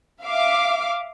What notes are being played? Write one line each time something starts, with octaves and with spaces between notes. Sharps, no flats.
E5 F5 D6